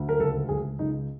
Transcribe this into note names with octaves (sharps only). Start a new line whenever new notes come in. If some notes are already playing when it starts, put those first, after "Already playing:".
Already playing: D2
A#4
C#2 A4
C#2 G#4
C#2 D#4